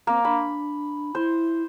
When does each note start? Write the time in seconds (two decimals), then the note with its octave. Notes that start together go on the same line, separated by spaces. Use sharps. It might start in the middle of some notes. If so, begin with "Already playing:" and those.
0.07 A#3 C4
0.25 D4 B5
1.15 E4 C5